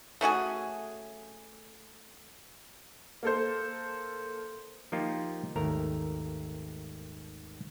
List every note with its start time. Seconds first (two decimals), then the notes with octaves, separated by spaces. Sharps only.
0.21 A3 C#4 F#4 G#4
3.23 A#3 A4 C5
4.92 F3 A#3 D#4 F4 G4
5.56 G#1 D#2 A3 A#4 A#5